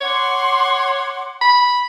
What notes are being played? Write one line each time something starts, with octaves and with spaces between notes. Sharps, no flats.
C#5 F#5 C6 D6
B5